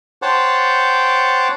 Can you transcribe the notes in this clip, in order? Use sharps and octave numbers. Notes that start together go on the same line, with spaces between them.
C5 C#5 F#5 G5 A5 D6